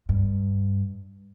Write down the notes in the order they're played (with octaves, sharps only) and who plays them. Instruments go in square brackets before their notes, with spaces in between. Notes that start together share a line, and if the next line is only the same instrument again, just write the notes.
[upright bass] G2